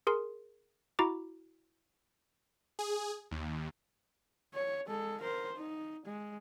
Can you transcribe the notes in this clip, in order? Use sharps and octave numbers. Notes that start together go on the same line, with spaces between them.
G#4 A#4 C6
E4 F#4 A#5 D6
G#4
D#2
C#5
G#3 A4
A#4 C5
D#4
G#3